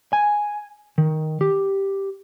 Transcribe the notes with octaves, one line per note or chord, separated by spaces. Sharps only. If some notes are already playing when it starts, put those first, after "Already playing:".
G#5
D#3
G4